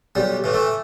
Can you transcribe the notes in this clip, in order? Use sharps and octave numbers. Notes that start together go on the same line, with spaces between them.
B1 G3
A2 E3
A3